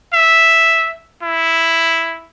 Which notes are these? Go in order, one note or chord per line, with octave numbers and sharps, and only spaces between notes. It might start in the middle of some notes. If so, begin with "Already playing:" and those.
E5
E4